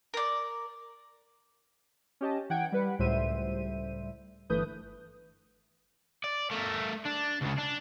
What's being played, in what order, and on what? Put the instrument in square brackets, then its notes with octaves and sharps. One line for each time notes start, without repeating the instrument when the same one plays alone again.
[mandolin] A#4 D5
[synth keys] C#4 G4 D#5 A5
E3 F#5 G5 G#6 D7
G3 B4 F#5
C#2 A2 G3 C5 E5 D#7
G1 E3 A3 B4 D#6 G6
[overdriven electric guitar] D5
A3 A#4
D4
C#2 C#3
D4